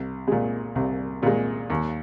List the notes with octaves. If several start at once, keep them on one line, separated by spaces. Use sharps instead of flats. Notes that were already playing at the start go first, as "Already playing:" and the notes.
Already playing: C2
A#2 G#3
C2
A#2 G#3
D#2